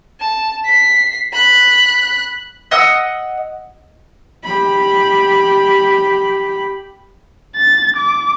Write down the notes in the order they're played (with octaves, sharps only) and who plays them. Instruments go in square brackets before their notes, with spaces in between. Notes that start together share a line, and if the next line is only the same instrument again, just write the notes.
[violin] A5
B6 C7
B5 F#6
[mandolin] D#5 F#5 D#6 E6
[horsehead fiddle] G4 B5
[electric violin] A6
D6